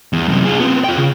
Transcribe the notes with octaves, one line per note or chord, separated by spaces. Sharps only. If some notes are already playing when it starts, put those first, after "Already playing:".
E2
F#2 C3
F4 G#4
B3 C4
F4 G5
C#3